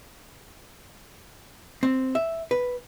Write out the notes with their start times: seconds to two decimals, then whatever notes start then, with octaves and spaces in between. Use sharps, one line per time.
1.83 C4
2.15 E5
2.51 B4